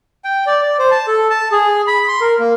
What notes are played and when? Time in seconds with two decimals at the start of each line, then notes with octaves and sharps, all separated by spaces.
0.24 G5
0.46 D5
0.62 D5
0.79 C5
0.91 A5
1.07 A4
1.30 A5
1.52 G#4
1.87 B5
2.08 C6
2.21 A#4
2.39 A#3